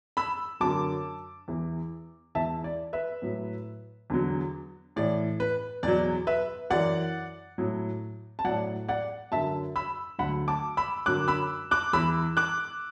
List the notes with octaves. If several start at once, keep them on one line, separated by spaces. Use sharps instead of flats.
B5 E6
F#2 D3 F#3 A5 D6
E2 E3
E2 E3 E5 A5
D5
B4 E5
A2 F#3
E2 D3 F#3
A2 E3 D5
B4
E2 B2 F#3 D5
B4 E5
F#2 E3 D5 F#5
A2 F#3
A5
A2 F#3 D5 F#5
D5 F#5
F#2 D3 F#3 E5 A5
B5 E6
D2 D3 F#3 F#5 B5
A5 D6
B5 E6
F#2 D3 F#3 D6 F#6
B5 E6
D6 F#6
E2 E3 B5 E6
D6 F#6